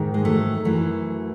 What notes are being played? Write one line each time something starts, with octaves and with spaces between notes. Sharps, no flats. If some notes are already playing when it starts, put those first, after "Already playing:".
Already playing: G#2 D#3
G#3
F#3 A3
F#2 E3 F#3 A3